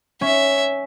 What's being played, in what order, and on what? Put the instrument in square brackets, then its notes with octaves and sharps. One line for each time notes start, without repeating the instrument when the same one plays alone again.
[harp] C#4 [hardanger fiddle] E5